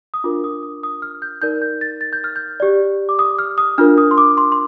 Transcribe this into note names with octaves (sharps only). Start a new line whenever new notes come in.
D#6
D4 F4 A#4 D6
D#6
D#6
D#6
F6
G6
D#4 A#4 D5 G6
G6
A6
A6
G6
F6
G6
G4 D5
D6
D#6
F6
D#6
D4 F4 A#4 F6
D#6
C6
D6
C6
C6